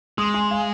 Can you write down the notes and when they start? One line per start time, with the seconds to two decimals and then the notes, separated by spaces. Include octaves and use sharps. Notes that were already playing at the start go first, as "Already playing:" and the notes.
0.18 G#3 C6 D#6
0.34 G#5 C6
0.51 F5 G#5